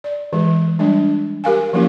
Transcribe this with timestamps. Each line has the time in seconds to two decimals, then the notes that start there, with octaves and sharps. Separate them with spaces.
0.04 D5
0.33 E3 G#3
0.79 G3 G#3 D4
1.44 G4 A#4 F5 G#5
1.73 F3 F#3 A#3 C#4 E4 G4